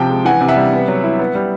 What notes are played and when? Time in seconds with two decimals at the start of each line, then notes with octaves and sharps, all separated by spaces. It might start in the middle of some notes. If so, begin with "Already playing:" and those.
Already playing: C3 F3 G5 A5
0.09 G#3
0.25 E3 F#5 G#5
0.41 C3
0.48 E5 F#5
0.56 G3
0.73 B3
0.88 F#3
1.03 E4
1.19 B3
1.35 G3